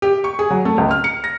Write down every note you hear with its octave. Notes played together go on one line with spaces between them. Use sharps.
G4
C#6
G#4
F#3
A3
C#2
F6
C#7
A#6